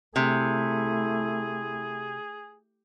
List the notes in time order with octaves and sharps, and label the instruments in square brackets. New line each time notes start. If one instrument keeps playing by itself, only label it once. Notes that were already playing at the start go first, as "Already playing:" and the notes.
[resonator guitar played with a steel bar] C3 [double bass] A3 E4 [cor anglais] G#4